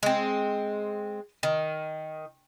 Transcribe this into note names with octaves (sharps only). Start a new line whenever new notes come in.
G#3 C4
D#3